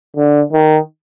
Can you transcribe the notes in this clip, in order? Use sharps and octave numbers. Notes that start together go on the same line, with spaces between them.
D3
D#3